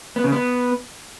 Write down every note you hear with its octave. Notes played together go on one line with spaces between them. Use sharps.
B3
C#3
B3